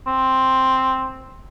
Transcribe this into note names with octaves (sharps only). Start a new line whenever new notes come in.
C4